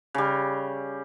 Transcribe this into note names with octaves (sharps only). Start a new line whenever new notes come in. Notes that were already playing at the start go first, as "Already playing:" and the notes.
C#3 G3